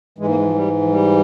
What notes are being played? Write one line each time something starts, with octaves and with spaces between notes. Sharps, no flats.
G#2 E3 G#3
A#3
G#3
F3
G3
F3
G3